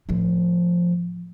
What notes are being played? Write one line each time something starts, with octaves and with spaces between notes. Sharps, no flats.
A2 F3